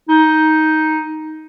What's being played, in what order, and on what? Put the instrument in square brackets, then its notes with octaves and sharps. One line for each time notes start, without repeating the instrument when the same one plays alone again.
[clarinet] D#4